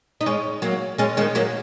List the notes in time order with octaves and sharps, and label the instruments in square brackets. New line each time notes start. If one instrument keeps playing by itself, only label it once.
[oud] D#4
G#3 C#4
F#3 A#3
G#3 C#4
D#3 G#3
F#3 A#3